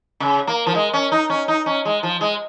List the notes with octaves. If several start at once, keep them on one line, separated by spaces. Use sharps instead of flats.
C#3
A#3
F3
G#3
C#4
D#4
C#4
D#4
C#4
G#3
F3
G#3